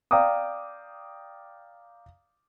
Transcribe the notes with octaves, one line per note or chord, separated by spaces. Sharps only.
D5 F5 G5 A#5 D6 D#6